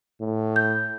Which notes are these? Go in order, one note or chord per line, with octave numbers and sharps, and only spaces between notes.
A2
G6